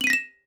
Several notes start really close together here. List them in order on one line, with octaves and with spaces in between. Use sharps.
F#7 D#7 B6 A#6 E7